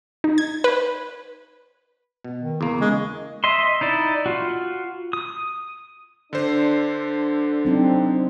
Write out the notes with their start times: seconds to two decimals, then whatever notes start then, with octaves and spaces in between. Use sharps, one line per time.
0.24 D#4
0.38 G#6
0.64 B4
2.24 B2
2.41 D#3
2.61 E2 C#3 A#3
2.81 G#3 C#4
3.44 D#5 E5 C6
3.81 D#4 E4 D5
4.26 F4 F#4
5.13 D#6
6.33 D3 D4 A4 C5
7.65 F#3 C4 D#4